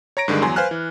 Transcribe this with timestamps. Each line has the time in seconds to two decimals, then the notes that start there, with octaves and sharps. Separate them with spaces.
0.17 C#5 A#5 A#6 D7
0.28 G2 D3 D#3 G#3
0.42 E2 F#3 G#5 C6
0.56 B4 C5 F5 G#5 F6 F#6
0.71 E3